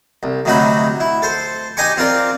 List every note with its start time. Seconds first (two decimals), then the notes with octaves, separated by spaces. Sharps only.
0.23 C2
0.45 D2 C3 F#3 D#4 F#4 B5
1.00 E4
1.22 A4 C5
1.77 D#4 G4 D#5 G#5 C#6
1.97 C4 F4 A#4 D5